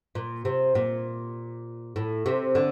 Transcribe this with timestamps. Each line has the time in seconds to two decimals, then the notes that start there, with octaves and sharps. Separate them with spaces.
0.15 A#2
0.45 C3
0.75 A#2
1.96 A2
2.26 C3
2.55 D3